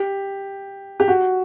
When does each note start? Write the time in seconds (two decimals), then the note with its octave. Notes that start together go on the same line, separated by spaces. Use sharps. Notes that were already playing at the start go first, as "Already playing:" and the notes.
Already playing: G4
1.00 G4
1.08 F#4